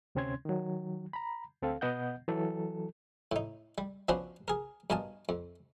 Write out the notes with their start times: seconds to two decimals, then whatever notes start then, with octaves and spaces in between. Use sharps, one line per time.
0.15 D2 C3 C4 C#4 C6 G#6
0.45 D#3 F#3
1.13 A#5 B5
1.62 D2 C4 A4 F5
1.81 B2 B3 D#5 F#5 G6
2.28 E3 F#3 A4
3.32 A2 D#4
3.78 G3
4.08 F3 B3 C#4 D4 F#4 C5
4.48 G#4 A#4
4.90 G2 B2 A#4 D#5 G#5 A5
5.29 F2